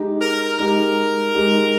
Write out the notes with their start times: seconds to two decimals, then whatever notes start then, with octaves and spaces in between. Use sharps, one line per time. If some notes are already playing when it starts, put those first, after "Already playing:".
Already playing: G#3 D#4 G4
0.22 A#4
0.59 G#3 D#4 G4 A#4
1.34 G#3 D#4 G4